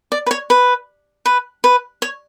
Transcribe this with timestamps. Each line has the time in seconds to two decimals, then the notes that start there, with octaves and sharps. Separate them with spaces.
0.12 D5
0.26 B4
0.31 C#5
0.50 B4
1.25 B4
1.64 B4
2.02 C#5